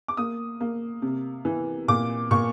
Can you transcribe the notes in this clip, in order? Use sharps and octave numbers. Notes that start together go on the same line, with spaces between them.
D6
A#3 D#6
A#3
C3
E3
A#2 D6
A#2 C#6